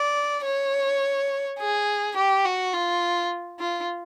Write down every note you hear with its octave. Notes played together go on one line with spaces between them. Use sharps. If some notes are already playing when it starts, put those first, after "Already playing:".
Already playing: D5
C#5
G#4
G4
F#4
F4
F4